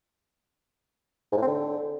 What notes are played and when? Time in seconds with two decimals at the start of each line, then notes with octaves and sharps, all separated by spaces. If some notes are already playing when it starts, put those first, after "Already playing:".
1.32 G#2
1.37 A2
1.42 C4
1.47 D3